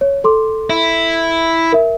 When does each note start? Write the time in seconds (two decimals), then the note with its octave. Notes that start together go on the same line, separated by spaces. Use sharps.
0.01 C#5
0.24 A4 C6 D6
0.70 E4
1.72 A#4 E5